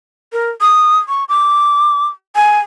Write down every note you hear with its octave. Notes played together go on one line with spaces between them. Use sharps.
A#4
D#6
C#6
D6
G#5